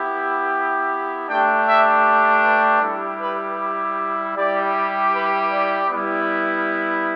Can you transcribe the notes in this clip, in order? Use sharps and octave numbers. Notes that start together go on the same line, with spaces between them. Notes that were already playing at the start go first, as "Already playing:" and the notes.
Already playing: B3 E4 G4
A3 D4 G4 G5
E5
B4
G3 E4 G4 A4
B4
G3 E4 G4 D5
B4
D5
G3 B3 E4